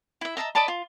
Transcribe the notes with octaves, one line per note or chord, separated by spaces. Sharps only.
E4 E5
D#5 E5 A5 A#5
D5 D#5 A5 B5
F4